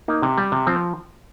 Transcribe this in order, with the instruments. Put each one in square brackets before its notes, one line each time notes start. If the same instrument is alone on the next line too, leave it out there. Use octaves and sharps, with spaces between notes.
[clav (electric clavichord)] A#3 D#4
C3
G3
C3
F3 C4